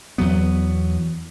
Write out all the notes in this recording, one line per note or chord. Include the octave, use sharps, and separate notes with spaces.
E2 F#3 B3